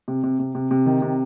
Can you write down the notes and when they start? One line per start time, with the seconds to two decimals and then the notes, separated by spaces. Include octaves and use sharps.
0.08 C3
0.23 C3
0.39 C3
0.55 C3
0.71 C3
0.86 D#3
1.02 C3